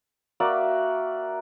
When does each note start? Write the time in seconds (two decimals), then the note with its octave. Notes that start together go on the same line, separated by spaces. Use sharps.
0.40 A#3 F#4 D5 E5